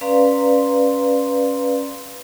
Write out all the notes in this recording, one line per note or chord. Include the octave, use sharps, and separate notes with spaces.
C#4 B4 D5 F5 A#5 C6